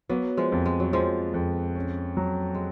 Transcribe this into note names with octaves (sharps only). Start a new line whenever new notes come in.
F#3 A#3 B3
F3 G#3
F2
G#3
F#3
F2 F3 G#3
F2
C#4
F#3
G#3